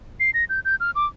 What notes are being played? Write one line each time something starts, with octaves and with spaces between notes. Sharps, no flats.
C7
A#6
G6
G6
F6
D6